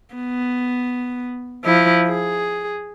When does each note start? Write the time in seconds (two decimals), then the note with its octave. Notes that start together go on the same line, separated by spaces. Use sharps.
0.15 B3
1.65 F3 E4
2.09 G#4